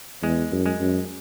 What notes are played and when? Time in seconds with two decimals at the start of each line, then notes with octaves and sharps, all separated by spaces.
0.23 E2 G#3
0.52 F#2
0.66 G#3
0.80 F#2